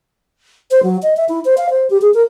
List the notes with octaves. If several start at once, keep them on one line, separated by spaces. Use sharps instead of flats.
C5
F#3
D#5
E5
E4
C5
F5
C5
G4
G#4
A#4